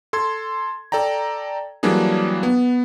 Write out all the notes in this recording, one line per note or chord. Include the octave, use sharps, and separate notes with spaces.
A4 C6 G#6
A4 D5 G5 A#5
E3 F#3 G3 A#3 D4 G#4
B3